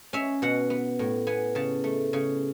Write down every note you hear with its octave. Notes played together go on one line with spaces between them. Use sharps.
C#4 E5
B2 F#5
B3
A2
B3 G#5
C#3 A5
A3
C#3